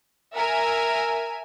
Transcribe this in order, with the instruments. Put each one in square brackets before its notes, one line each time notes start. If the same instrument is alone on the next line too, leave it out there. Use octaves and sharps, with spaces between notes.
[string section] A#4 E5 G#5